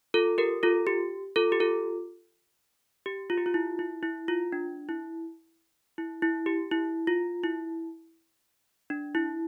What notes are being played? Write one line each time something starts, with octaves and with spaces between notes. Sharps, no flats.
F4 A4
G4 A#4
F4 A4
G4
F4 A4
G4
F4 A4
G4
F4
G4
F4
E4
E4
E4
F4
D4
E4
E4
E4
G4
E4
F4
E4
D4
E4